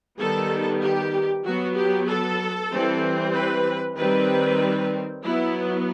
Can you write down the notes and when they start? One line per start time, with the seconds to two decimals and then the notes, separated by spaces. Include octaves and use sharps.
0.19 D#3 G3 B3 A4
0.83 G4
1.45 F#3 B3 F#4
1.77 G4
2.08 A4
2.72 E3 G3 C4
3.34 B4
3.97 D#3 G3 C4 B4
5.24 F#3 B3 E4